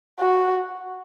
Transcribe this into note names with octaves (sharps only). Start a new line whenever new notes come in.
F#4